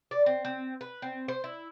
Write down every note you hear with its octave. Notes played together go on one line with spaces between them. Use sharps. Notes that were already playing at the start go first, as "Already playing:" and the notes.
D5
C4
C4
B4
C4
C5
E4